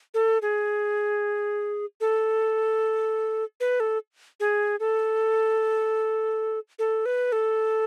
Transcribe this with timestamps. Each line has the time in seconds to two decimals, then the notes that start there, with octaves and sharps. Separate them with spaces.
0.14 A4
0.42 G#4
2.01 A4
3.60 B4
3.80 A4
4.40 G#4
4.80 A4
6.79 A4
7.06 B4
7.32 A4